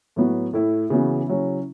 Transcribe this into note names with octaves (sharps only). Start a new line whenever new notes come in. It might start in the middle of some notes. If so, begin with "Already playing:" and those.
A2 F#3 B3 F#4
A2 A3 E4
C#3 E3 B3 F#4
C#3 F#3 C#4 E4